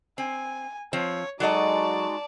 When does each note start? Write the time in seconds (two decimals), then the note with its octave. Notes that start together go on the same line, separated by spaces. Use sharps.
0.18 C4 G#5
0.93 F3 C4 C#5
1.40 F#3 G#3 D#4 F#4 A4 D5 D#5 A5